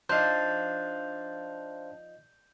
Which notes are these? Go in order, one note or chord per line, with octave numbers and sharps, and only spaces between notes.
F3 D4 D#4 C5 F5 G6